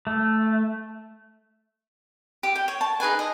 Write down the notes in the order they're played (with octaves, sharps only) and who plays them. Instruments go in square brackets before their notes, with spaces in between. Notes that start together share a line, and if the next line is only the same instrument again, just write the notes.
[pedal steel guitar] A3
[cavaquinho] G4
G5
C#5
A5
D#4 G#4 B4 G#5
D#5